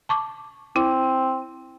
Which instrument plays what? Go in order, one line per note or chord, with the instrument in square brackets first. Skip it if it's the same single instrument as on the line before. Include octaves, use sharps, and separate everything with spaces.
[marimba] A5 C#6 D6
[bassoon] C4 [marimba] E4